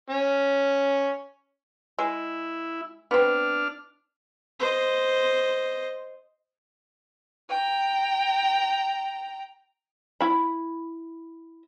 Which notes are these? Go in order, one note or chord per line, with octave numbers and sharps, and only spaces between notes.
C#4
G#3 E4
B3 C4 D4 F6
C5 D#5
G5 A#5
E4 B5